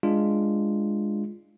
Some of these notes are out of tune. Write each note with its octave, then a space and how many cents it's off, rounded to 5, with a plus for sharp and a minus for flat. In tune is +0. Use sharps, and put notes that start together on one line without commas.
G#3 +0 D4 +0 F4 -10